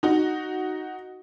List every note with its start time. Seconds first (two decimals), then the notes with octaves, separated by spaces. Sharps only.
0.03 D#4 F#4